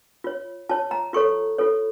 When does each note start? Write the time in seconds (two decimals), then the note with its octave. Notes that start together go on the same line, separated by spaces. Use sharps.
0.24 F4 C#5
0.69 F4 C#5 A5
0.91 A#5
1.13 F4 A4 C#5 C#6
1.58 F4 A4 C#5